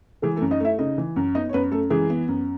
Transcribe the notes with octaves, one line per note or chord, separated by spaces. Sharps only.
E3 G#3 G#4
A3 A4
F#2
D#4 D#5
A3 E4 E5
C#3 D#4 D#5
E3
F#2
B3 D#4 D#5
C#5
F#2 B3 B4
F#2 A3 A4
E3 G#3 G#4
B3
F#2